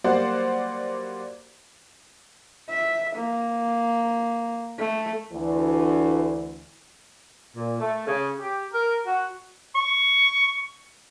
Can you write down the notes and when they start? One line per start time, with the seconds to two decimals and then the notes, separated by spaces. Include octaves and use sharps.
0.04 F#3 G3 A#3 C5 D5 F#5
2.69 E5
3.16 A#3
4.79 A3
5.31 D2 E3
7.56 A#2
7.80 A3
8.07 C#3
8.39 G4
8.73 A#4
9.06 F#4
9.75 C#6